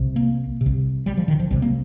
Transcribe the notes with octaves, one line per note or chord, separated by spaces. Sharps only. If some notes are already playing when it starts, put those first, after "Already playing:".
Already playing: C2 C3
A#3
C3
C2
G3
F3
D#3
F3
C2 C3 G3
A#3